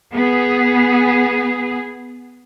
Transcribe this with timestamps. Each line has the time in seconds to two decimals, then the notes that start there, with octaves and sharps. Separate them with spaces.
0.15 B3 G#4